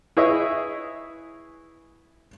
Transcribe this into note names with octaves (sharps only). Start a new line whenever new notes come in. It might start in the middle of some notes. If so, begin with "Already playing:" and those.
E4 G#4 B4 C#5 D#5 E5